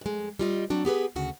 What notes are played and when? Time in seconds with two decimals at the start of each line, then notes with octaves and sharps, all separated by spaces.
0.01 F2 G#3
0.39 G3 F4 D#5
0.70 F#3 C4 D4 F#4
0.85 B3 G4 G#4 B4
1.16 D2 C#3 F#4 F#5